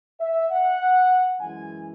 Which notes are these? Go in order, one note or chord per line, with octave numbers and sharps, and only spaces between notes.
E5
F#5
F#2 E3 G#3 G#5